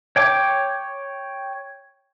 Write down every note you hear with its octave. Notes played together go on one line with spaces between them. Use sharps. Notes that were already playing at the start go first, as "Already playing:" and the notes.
C#5 G5 D6